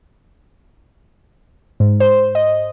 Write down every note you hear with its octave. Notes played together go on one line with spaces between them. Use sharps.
G#2
C5
D#5